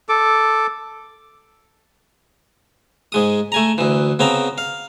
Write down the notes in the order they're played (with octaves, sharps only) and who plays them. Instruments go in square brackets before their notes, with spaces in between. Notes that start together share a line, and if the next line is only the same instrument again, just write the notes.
[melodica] A4 D6
[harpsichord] G#2 G#3 D#6
A3 G#5 A#5
D2 E3
C#3 B3 C4 G5 A#5
F5